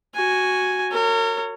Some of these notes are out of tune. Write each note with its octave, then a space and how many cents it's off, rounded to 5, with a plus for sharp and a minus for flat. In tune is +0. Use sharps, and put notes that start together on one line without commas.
F#4 +0 G#5 +0
A#4 -35 C#5 +0